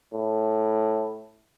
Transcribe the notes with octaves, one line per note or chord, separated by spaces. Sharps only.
A2